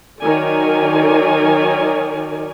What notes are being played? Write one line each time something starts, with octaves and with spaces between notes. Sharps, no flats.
D#3 F#3 A#4 C#5 D5 G#5